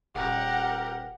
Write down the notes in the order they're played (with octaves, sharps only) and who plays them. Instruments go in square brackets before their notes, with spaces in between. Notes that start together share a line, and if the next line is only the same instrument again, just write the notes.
[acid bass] D#1 [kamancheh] G4 A#4 [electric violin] F#5